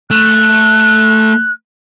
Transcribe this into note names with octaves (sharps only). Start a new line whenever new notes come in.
A3 F#6